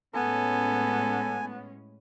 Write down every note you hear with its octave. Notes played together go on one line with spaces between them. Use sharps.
A2 G#3 B3 C#4 A4 G#5